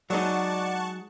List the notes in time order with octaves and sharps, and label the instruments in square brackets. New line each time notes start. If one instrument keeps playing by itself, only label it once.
[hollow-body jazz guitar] F#3 G#3 D#4 [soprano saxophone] D5 [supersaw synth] F#5 A5 C#6